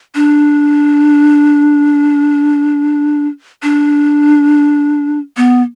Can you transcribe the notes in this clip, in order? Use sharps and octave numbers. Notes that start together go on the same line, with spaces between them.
D4
D4
B3